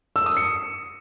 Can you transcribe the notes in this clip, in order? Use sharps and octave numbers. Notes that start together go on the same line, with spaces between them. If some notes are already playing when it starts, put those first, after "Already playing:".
E6
D#6
C#7